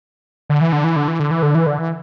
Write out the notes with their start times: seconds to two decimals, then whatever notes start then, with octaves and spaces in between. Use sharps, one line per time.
0.50 D3
0.61 E3
0.73 D3
0.84 E3
0.96 D3
1.08 E3
1.20 D3
1.31 E3
1.43 D3
1.55 E3
1.67 D3
1.78 E3